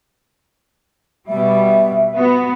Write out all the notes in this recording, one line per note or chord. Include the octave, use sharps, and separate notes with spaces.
B2 G3 E5
B3 F#4